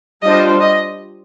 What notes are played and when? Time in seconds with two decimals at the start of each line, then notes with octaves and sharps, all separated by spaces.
0.22 G3 D4 F4 C5 D#5
0.61 D#5